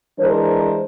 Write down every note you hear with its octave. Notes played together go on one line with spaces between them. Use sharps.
E3 G#3 D4 A#4 C5